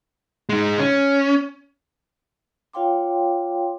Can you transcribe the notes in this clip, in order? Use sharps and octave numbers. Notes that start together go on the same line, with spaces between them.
G#3 D#4
C#4
F4 C#5 F5 G5 C6 D6